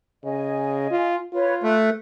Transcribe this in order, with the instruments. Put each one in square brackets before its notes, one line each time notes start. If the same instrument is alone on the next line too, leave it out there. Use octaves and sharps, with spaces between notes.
[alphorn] C#3 [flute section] D#5 G#5
[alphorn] F4
[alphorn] F4 [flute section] B4 C#5
[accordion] A3 [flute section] F#6